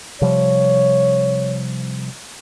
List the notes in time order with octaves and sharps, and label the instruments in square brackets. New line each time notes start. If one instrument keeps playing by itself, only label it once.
[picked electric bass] C3 F3 G3 [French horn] C#5